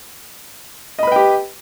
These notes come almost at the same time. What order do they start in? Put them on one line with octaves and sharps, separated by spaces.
D#5 B5 B4 G5 G4